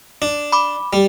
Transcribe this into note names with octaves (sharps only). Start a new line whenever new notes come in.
D4
B5 D6
G3